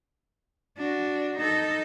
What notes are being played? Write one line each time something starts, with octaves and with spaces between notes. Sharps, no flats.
D4 F#4
D#4 A4